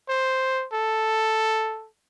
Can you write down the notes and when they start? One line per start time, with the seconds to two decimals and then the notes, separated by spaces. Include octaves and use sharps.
0.09 C5
0.73 A4